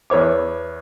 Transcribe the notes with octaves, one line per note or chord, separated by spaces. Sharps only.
E2 B3 C#5 D6